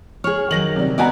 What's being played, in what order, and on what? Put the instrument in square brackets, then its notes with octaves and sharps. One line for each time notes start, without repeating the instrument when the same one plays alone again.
[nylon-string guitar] G#4 C#5 [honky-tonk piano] F6
[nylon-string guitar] D#3 F#3 [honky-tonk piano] A#6 F#7
[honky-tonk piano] C3 G3
[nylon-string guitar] B3 F#4 D5 [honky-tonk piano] D#5 G#5 A#5